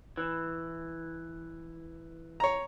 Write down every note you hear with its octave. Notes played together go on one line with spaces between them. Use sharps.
E3
C#5 A#5